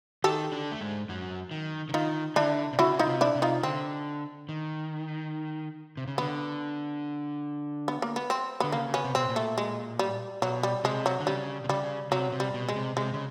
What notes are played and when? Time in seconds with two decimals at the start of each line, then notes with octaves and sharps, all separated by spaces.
0.24 D#3 D#4 G4 A4
0.52 D3 D4
0.72 A3
0.81 G#2 G#3
1.09 F#2 F#3
1.51 D#3
1.89 D3
1.94 D#3 D#4 F4
2.36 D3 D4 E4
2.73 C3
2.79 C#3 E4 F#4
2.99 D#4 F4
3.06 C3
3.21 D4 E4
3.35 C3
3.42 D#4 F4
3.63 D3 C4
4.49 D#3
5.97 C3
6.07 C#3
6.18 D3 B3
7.88 B3
8.02 A#3
8.16 B3
8.30 C4
8.60 D3 B3
8.72 C#3 A#3
8.94 B3 C#4
9.05 C3
9.15 B2 C4
9.29 A#2
9.36 A3
9.58 G#3
9.99 G3
10.42 B2 F#3
10.63 G3
10.84 C3 G#3
11.06 F#3
11.20 D3
11.27 C#3 G3
11.64 C3
11.69 C#3 G3
12.11 C3 F#3
12.32 C3
12.40 G3
12.54 B2
12.69 G#3
12.76 C3
12.97 C3 G#3
13.14 C#3